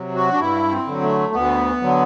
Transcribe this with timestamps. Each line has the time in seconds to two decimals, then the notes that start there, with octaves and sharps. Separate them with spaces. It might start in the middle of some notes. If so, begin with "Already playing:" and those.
Already playing: C3 F#3
0.15 F#4
0.32 D4
0.40 G2 E4
0.71 C4
0.87 D3 F#3
1.02 A3
1.34 D2 B3
1.82 D3 F#3